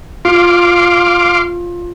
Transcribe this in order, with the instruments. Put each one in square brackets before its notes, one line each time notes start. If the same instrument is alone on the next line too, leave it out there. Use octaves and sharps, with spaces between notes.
[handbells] F4 [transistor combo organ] F5 C6 D6